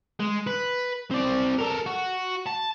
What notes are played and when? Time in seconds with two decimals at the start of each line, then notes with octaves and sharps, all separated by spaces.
0.20 G#3
0.47 B4
1.11 C4 D5
1.58 A4 A#4
1.86 F#4
2.47 A5